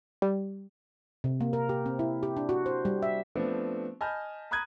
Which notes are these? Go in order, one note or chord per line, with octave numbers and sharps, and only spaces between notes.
G3
C3
A#3
A#4
G4
C4
E4
G4
D4
F#4
C5
G3
E5
F3 A3 B3 C4 D4
D#5 G#5 A5 B5 F6 G6
A#5 B5 D#6 F#6 G#6 D#7